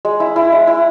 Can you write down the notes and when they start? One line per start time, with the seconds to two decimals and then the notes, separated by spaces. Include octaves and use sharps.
0.05 G#3
0.20 E4
0.36 E4
0.52 G#3
0.67 E4